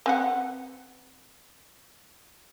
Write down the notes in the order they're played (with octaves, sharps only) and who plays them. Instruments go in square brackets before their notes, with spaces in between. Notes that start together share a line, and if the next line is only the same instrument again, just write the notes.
[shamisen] C4 B4 F#5